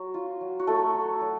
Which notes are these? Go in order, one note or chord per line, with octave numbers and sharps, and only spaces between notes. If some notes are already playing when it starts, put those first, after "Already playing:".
Already playing: F#3 F#4
F4
F#3
F#4
F#3 A3 A4
F#3
F#3